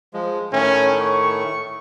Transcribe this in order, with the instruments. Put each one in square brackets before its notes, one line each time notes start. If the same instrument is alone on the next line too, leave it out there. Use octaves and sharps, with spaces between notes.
[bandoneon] F3 G#3
[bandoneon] A2 D#3 A3 [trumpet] C#4
[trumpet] C#6